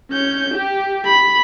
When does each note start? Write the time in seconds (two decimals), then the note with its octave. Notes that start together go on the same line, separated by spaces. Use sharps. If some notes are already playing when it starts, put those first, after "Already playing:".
0.11 C#4 G6
0.54 G4
1.06 B5